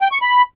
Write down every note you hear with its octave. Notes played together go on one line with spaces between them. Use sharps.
G5
C#6
B5